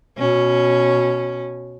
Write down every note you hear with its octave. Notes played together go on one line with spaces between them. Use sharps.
B2 C#4